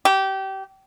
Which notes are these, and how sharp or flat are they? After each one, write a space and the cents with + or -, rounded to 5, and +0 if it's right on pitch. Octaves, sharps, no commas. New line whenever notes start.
G4 -25